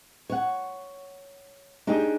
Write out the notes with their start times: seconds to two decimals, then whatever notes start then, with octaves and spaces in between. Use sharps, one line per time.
0.30 C#5 F#5
1.87 D4 D#4 G4 G#4